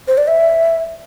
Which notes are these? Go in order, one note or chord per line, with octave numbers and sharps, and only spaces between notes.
C5
D5
E5